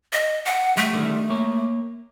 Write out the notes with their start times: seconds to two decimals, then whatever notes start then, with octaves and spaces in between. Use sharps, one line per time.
0.13 D#5
0.45 F#5
0.77 G3 A3
0.93 D3 D#3 G3
1.30 A#3 C#5